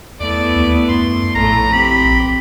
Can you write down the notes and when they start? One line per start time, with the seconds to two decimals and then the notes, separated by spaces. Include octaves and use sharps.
0.20 E2 A3 B3 E4 D5
0.56 D#2
0.89 F#2 C6
1.35 A#1 A2 A3 A#5
1.73 C4 G4 B5
2.05 A#1